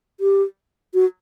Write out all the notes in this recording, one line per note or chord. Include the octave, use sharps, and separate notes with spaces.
G4
F#4